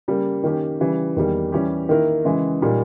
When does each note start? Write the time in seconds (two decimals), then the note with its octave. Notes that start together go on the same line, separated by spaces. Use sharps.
0.08 C#3 G3 A#3
0.44 D#3 A#3 C#4 G4
0.81 C#3 E3 G3
1.16 E2 D#3 G3 A#3
1.52 E3 G3 C#4 G4
1.89 D#3 A#3 E4 A#4
2.25 C#3 E3 G#3
2.61 A#2 G3 A#3 D#4